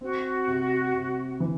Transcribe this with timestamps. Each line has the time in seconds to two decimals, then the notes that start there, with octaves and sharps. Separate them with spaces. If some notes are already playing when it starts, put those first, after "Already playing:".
0.01 C4 F#4
0.47 C3
0.94 C3
1.40 E3